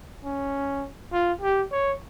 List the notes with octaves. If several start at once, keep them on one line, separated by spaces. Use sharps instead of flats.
C#4
F4
G4
C#5